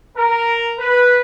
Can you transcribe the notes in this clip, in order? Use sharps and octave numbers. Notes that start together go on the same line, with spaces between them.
A#4
B4